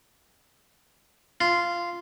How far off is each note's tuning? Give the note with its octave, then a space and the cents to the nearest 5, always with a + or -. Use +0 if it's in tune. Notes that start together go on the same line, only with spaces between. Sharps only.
F4 -10